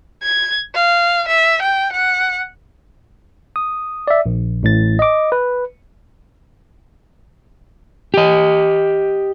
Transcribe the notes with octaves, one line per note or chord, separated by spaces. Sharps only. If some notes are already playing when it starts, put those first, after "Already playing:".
G#6
F5
E5
G5
F#5
D#6
D5 E5
A#1
A1 A2 A6
D#5 D6
B4
G4 D#5